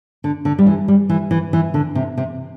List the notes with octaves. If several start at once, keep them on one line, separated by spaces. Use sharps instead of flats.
D3
D3
G3
E3
G3
E3
E3
E3
D3
C3
C3